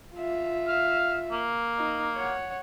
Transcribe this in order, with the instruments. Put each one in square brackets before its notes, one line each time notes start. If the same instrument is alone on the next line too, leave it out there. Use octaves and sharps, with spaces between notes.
[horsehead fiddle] F4 E5
[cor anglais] F5
A#3
[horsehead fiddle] D#4
C#5 F#5